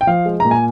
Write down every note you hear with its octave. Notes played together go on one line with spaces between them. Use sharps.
G5
F3 F5
G#3
A#2 A#5
G#5